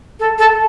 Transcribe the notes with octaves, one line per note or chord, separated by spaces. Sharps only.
A4
A4